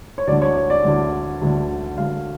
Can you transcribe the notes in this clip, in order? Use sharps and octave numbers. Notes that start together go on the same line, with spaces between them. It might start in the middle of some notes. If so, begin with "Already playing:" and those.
C#5
D2 D3 D5
C#5
C#5
D5
D2 D3
D2 D3
D2 D3 F5